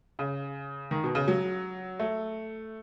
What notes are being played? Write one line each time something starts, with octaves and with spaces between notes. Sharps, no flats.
C#3
D#3
B2
C#3
F#3
A3